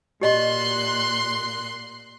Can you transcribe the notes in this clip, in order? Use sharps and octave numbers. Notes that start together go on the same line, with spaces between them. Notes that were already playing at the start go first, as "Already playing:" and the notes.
A#2 G4 D#5 C6 F#6